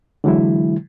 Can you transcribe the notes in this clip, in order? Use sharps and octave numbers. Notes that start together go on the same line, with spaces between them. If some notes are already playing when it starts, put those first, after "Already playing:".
D3 E3 F#3 G#3 E4